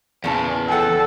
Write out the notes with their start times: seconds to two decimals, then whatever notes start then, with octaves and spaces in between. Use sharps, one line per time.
0.24 E2 A#2 C#3 A5
0.68 A4 F#5 G5